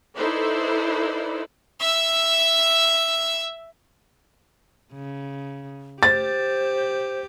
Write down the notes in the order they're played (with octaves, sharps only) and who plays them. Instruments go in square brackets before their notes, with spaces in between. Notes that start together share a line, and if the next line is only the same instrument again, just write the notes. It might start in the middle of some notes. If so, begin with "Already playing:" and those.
[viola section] D#4 E4 A4 B4 C5 D5
[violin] E5 E6
[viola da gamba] C#3
[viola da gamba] G4 [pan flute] C5 [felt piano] A6